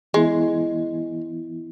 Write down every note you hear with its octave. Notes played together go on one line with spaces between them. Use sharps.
E3 G#3 B3 E4